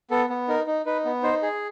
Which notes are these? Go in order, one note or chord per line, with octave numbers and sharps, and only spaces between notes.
B3 A4
B3
D#4 A#4
D#4
D#4 B4
B3
D#4 C5
G#4